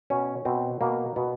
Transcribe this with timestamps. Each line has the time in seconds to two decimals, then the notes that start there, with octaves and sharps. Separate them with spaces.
0.10 B2 C#4
0.45 B2 C4
0.81 B2 A#3
1.16 B2 B3